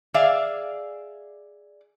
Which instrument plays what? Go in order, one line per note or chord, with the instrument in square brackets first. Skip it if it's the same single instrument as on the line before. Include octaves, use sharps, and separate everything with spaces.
[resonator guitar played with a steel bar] G#4 D5 E5 F5